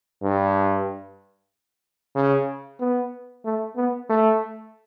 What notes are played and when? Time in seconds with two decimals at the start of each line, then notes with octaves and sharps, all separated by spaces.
0.23 G2
2.16 C#3
2.80 B3
3.45 A3
3.77 B3
4.10 A3